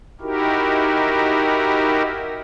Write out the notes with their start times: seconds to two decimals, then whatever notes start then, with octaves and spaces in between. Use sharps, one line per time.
0.21 D#4 E4 F#4 G4 A#4